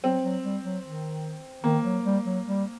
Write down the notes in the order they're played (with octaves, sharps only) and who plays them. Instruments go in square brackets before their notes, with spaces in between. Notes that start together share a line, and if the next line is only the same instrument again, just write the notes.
[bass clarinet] F#3 [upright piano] C4
[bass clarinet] F#3
G3
F#3
D#3
[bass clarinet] D#3 [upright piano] A#3
[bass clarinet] F#3
G3
F#3
G3